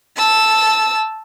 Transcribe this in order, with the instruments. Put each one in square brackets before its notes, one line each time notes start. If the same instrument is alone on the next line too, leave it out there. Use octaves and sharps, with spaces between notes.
[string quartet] A5 E6